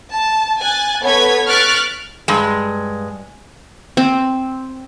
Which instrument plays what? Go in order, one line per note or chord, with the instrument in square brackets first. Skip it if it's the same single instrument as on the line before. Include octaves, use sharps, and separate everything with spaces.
[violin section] A5
G#5 F#6 A6
B3 A4 B4 C#5 G#6 B6
C#6 F6 F#6 A6 B6 D7
[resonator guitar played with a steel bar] G2 G#3
[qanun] C4